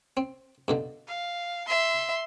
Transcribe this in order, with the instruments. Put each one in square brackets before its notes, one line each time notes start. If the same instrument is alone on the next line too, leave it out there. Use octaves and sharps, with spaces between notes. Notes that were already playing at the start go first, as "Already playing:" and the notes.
[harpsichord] C4
G2 B2 D3
[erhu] F5
[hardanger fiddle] E5 [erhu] C6